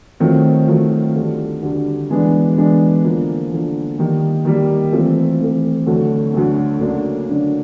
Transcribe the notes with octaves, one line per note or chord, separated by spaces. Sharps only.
D#3 F#3 A3 C4 F4
D#3 F#3 A3 C4 F4
D2 D3 G3
D2 D3 G3
E3 G#3 B3 D4
E3 G#3 B3 D4
D3 F3 A#3
D3 F3 A#3
D#3 G3 A#3
D#3 G3 A#3
E3 A3 C4 F4 A4
E3 A3 C4 F4 A4
D2 D3 F#3 A3
D2 D3 F#3 A3
D2 C#3 F#3 A#3 D4
D2 C#3 F#3 A#3 D4